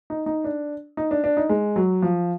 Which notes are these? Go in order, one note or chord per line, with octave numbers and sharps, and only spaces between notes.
D#4
D#4
D4
D#4
D4
D4
D#4
G#3
F#3
F3